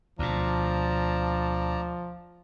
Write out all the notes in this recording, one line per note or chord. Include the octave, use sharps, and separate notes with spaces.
D2 B2 F3 D5 A5 A#5